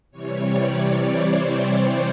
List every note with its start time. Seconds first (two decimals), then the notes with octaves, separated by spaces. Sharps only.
0.11 C3 E3 G3 C#5
0.42 D5
0.74 C#5
1.06 C5
1.36 C5
1.68 C#5